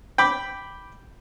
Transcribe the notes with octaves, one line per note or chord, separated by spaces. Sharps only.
G5 B5 D6